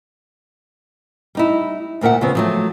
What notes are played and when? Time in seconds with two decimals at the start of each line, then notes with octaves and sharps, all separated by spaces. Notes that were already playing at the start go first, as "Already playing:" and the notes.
1.35 G3 D#4 E4
2.01 D2 A#2 A#4 E5 F#5
2.21 C#3 F3 B3 C4
2.35 F3 F#3 A3